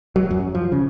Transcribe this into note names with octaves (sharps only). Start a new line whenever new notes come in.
F#3
F#2
F3
C#3